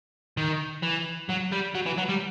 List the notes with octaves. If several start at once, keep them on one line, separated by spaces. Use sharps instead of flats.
D#3
E3
F#3
G3
F#3
E3
F#3
G3